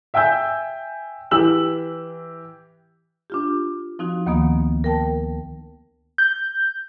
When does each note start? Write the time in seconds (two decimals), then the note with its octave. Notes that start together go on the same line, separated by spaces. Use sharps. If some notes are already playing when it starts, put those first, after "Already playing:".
0.14 E5 G5 G#5 E6 G6
1.31 E3 G4 E6 F#7
3.30 D4 F4 G4
3.99 F3 C4 D#4 F#4
4.26 D2 D#3 A#3 B3 D#6
4.84 A#4 G5 A5
6.18 G6